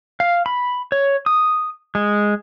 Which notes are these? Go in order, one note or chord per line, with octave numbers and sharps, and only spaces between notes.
F5
B5
C#5
D#6
G#3